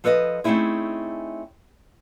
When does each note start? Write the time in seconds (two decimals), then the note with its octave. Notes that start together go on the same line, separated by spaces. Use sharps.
0.04 F3 A4 B4 C#5 D#5
0.44 A3 C4 C#4 D#4 E4 G#4